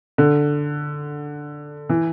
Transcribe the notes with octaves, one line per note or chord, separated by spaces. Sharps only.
D3
E3